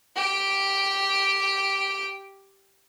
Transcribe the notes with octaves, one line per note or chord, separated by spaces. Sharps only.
G4 G5